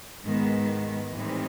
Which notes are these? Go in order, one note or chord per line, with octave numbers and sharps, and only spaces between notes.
G#2 D#3 G#3 B3
A2 E3 G3 C4 D#4